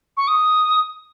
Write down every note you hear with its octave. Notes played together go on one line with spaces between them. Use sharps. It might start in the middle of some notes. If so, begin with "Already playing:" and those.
C#6
D#6